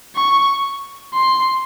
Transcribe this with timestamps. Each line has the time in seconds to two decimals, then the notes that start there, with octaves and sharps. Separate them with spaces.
0.16 C#6
1.14 C6